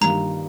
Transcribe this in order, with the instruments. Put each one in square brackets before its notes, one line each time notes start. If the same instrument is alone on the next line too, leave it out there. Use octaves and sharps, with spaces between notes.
[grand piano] G2 D#3 G3 A#3 F4 [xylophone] A#5